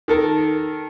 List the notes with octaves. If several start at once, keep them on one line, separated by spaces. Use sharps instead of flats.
D#3 A4 A#4